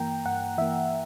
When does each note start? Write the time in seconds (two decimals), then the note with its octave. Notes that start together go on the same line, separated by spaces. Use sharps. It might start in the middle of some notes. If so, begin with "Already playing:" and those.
Already playing: G2 E3 A#3 G5 A#5
0.26 G2 F#5
0.58 E3 A#3 E5